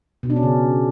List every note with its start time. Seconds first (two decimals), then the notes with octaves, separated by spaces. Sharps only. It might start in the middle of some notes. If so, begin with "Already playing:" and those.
0.23 B2
0.30 D4
0.36 C#4
0.43 C#3